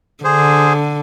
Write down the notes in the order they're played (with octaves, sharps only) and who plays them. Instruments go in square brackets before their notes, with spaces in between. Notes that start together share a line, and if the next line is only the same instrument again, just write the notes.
[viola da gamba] D3 [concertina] G#4 C5